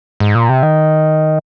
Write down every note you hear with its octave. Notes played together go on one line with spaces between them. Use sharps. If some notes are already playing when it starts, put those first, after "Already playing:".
G#2
A#2
C3
D#3